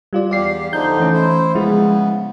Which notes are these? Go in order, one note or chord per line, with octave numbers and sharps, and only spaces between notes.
G3 F4 D5
E2 G4 D5 F5 C7
D3 F3 D#4 G6
E3 A3 C#4
E4 C5
C#3 F3 G#3 B3 E4